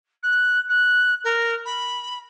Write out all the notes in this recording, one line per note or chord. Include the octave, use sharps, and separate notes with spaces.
F#6
F#6
A#4
B5